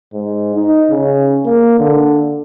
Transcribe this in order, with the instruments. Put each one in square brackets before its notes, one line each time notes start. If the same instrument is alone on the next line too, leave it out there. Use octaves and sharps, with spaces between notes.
[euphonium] G#2
D#4
C#3
A#3
D3